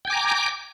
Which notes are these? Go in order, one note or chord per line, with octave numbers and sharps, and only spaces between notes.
G5 G#5 A#5 D6